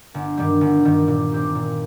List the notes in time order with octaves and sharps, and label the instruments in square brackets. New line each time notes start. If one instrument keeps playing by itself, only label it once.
[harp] G1
G2 D#3 G3
G1
G2 D#3 G3
A#2
G3 C4 G4
A#2